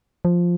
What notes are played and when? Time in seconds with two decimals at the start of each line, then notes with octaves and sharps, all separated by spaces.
0.25 F3